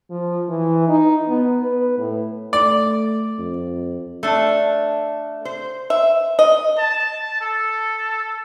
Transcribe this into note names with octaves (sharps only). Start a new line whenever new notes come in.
F3
E3
D#4
B3
B4
A2
A3 D5
F2
A3 D4
C5
E5
D#5
A5
A4